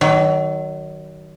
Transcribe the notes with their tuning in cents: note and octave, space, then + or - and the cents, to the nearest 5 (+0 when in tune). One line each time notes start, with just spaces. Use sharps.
D#3 +0 F#3 +30